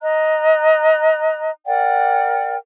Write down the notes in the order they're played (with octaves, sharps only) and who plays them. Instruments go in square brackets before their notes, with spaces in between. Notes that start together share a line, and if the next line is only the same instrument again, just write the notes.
[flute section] D#5 A#5 F#6
A#4 D5 F#5 G5